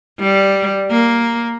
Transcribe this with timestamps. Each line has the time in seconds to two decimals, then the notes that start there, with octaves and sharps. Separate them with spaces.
0.19 G3
0.90 A#3